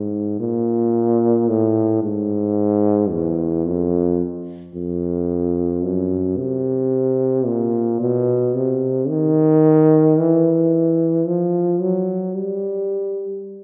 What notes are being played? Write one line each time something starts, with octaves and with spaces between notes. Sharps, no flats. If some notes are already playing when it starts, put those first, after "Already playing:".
Already playing: G#2
A#2
A2
G#2
E2
F2
F2
F#2
C3
A#2
B2
C3
D#3
E3
F3
F#3
G3